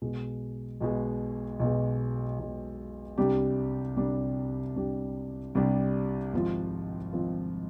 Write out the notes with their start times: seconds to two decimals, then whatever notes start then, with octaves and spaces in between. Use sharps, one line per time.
0.02 B1 B2 G#3
0.80 B1 B2 G#3
1.60 B1 B2 G#3
2.39 B1 B2 G#3
3.18 C2 C3 G3 D4 G4
3.97 C2 C3 G3 D4 G4
4.76 C2 C3 G3 D4 G4
5.55 C2 C3 G3 D4 G4
6.33 G#1 G#2 F3 C4 F4
7.13 G#1 G#2 F3 C4 F4